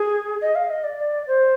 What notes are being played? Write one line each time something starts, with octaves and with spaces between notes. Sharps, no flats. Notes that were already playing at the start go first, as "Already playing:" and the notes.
Already playing: G#4
D#5
F5
D#5
D5
C5